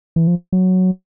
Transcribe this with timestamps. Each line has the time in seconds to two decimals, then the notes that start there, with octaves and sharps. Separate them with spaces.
0.16 E3
0.27 F3
0.52 F#3